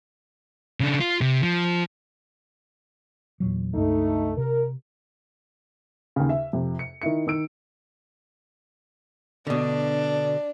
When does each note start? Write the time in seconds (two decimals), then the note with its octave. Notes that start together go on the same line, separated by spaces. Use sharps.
0.80 C#3 D4
1.00 F4
1.21 C3
1.42 F3
3.40 E2 A#2 F#3
3.75 C#2 G2 A3 D#4
4.38 C3 A#4
6.16 D#2 C#3
6.29 E5
6.53 F2 C3
6.79 C#7
7.02 D#3 D#4 E4 C#7
7.27 D#3 E6 D7
9.47 B2 D3 D4